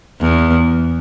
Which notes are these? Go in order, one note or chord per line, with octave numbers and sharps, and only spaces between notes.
E2